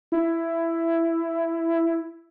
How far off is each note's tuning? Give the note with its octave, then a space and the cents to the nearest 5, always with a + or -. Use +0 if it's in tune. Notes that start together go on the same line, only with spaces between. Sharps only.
E4 +10